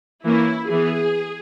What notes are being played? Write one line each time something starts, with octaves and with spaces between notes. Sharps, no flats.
E3 A#3 C#4 E4
E3 B3 G#4